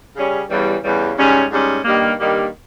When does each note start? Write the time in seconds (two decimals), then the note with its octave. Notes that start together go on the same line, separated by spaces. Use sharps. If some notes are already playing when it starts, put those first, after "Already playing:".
0.15 C#3 G3 C#4
0.50 E2 C#3 E3 G3
0.83 E2 C#3 E3 G3
1.17 G#2 G3 C#4
1.51 G#2 G3 C#4
1.84 G2 D#3 G3 A#3
2.19 G2 D#3 G3 A#3